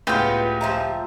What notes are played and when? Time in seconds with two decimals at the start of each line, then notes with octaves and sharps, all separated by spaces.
0.07 C#2 A2 B3 F4 G4
0.61 F3 E5 A#5